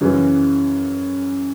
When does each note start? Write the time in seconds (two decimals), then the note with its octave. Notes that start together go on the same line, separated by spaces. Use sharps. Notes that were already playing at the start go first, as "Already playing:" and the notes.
0.01 F#2 C#3 E3